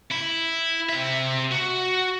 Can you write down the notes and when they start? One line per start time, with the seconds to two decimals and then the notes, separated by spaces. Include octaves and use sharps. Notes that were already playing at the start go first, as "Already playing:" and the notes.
0.11 E4
0.89 C3 E5
1.51 F#4